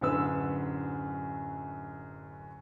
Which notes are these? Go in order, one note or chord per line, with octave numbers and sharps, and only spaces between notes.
D1 F#2 D3 B4 E6